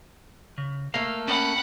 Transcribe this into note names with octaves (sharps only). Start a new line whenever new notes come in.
C#3
A3 A#3 F5
C#4 F#5 B5